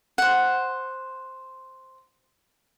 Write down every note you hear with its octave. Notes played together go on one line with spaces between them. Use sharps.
C5 F#5